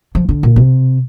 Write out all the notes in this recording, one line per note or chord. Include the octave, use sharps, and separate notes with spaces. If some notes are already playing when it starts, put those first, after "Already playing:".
F3
D3
A#2
C3